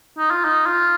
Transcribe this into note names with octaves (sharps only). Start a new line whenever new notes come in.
D#4
F4
D#4
F4